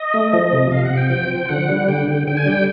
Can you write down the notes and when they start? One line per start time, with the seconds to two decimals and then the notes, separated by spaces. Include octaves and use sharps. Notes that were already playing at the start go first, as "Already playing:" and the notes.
Already playing: D#5
0.14 A3
0.33 F3 D#5
0.53 C3
0.71 C3 F5
0.85 F#5
0.90 C3
0.97 G5
1.10 F3 G5
1.30 F3
1.49 D3 F#5
1.69 G3
1.88 D3 G5
2.08 D3 G5
2.27 D3 G5
2.37 G#5
2.46 G3 G5